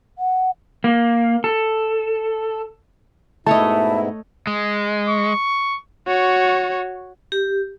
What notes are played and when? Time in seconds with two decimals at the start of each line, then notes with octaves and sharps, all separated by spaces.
0.18 F#5
0.84 A#3
1.44 A4
3.47 G#2 B2 A3 E4 C#5 D#5 E5 A5
4.47 G#3
5.09 C#6
6.08 F#4 C#5
7.32 G4